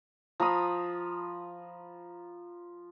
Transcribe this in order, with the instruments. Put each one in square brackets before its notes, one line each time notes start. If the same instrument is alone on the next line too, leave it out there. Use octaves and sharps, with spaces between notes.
[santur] F3 A#5 B5 D#6